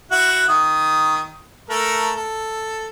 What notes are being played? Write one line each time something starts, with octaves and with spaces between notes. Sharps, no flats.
E4 F#4 F#5
D#3 D#6
A3 A4 A#4
A4